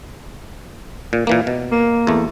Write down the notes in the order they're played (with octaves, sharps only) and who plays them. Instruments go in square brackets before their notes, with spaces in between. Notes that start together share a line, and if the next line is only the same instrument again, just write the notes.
[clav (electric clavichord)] A#2
A#2 E3 A#3
B2
[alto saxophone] A#3
[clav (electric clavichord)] E2 A3